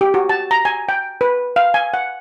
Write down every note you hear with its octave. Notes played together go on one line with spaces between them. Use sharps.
G4
F#4
A5
A#5
G#5
G5
B4
F5
G#5
F#5